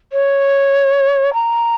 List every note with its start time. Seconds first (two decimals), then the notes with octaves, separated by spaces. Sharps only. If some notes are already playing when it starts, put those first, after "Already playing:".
0.13 C#5
1.34 A#5